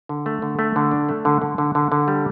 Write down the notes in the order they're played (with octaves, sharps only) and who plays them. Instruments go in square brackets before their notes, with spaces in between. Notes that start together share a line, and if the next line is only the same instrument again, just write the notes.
[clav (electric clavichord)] D3
A3
D3
A3
D3
D4
A3
D3
D3
D3
D3
D3
G3